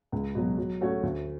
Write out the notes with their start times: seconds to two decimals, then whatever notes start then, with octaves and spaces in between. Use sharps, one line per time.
0.12 C#2
0.35 B2 F#3
0.58 F#3
0.81 A3 C#4 F#4 C#5
1.03 D2